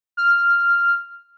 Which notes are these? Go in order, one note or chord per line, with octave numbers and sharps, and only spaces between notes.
F6